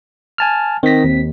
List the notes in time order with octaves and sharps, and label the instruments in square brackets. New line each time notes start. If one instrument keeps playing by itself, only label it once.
[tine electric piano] G#5 A5 F6
[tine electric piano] D#3 A#6 [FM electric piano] C4 B6
[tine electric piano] D#2